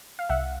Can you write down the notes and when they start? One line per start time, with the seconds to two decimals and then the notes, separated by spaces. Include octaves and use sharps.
0.19 F5
0.29 C2 E5 F#5